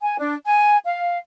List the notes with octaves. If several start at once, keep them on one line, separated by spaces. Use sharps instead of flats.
G#5
D4
G#5
F5